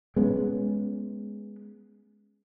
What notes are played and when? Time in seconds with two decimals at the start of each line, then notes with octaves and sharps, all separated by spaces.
0.16 G#3 B3 C#4